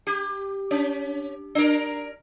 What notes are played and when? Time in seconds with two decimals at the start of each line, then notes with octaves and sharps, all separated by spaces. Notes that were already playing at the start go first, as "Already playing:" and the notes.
0.07 G4
0.71 C#4
1.55 D4 A#4